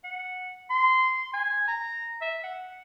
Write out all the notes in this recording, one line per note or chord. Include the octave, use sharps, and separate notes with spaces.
F#5
C6
G#5
A#5
E5
F#5